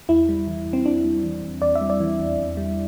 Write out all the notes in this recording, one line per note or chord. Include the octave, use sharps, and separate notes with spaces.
E2 E4
G3
E3
E2
C4
E2 D4
G3
E3
E2
E2 D5
E5
G3
D5
E3
E2
E2
G3